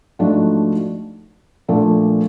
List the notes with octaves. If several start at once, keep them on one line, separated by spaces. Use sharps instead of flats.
G#2 F3 A3 D4 F#4
A#2 F3 A3 D4